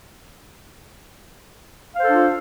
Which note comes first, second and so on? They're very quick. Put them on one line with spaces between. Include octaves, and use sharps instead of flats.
F5 C5 A4 D4 F4